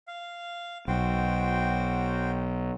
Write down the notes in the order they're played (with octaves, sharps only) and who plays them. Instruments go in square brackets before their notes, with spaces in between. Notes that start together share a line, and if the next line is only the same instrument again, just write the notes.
[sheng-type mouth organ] F5
[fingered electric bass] B1 [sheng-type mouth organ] F#4 C5 G5